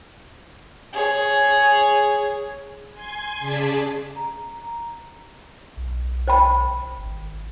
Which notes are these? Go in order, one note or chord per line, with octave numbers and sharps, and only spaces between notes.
G#4 C#5
G#5 C6 G#6
C#3 G#4 D5 A5 B6
A#5
B1
C5 G5 B5
G#1